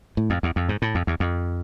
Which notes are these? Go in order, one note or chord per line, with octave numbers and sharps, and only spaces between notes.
A2
F2
E2
F2
G#2
A2
F2
E2
F2